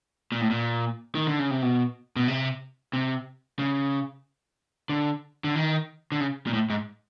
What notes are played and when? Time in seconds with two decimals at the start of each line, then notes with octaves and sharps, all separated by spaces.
0.32 A#2
0.41 A2
0.50 A#2
1.15 D#3
1.27 D3
1.39 C#3
1.51 C3
1.62 B2
2.16 B2
2.28 C3
2.93 C3
3.59 C#3
4.89 D3
5.44 D3
5.56 D#3
6.12 D3
6.20 C#3
6.47 A#2
6.53 A2
6.70 G#2